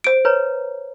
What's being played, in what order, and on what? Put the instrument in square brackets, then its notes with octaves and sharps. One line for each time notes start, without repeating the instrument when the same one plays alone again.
[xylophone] C5 D7
[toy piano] B4 C#5 A#5